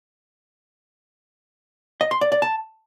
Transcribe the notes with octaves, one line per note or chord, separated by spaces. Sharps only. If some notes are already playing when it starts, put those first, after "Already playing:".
D#5
C6
D5
D5
A5